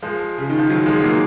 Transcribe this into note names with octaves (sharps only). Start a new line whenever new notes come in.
F3 G#3
C#3
D#3
F3
D#3 F#3
F3 G#3
F#3 A#3